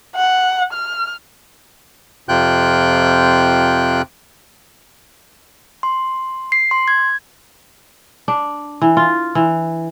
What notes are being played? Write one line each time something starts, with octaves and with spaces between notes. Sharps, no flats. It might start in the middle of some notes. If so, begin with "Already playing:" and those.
F#5
F6
F2 C3 F4 G5 F#6 G6
C6
C7
C6
G#6
D4
E3
F4
E3